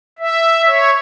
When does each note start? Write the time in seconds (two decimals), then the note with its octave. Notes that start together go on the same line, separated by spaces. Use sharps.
0.19 E5
0.66 C#5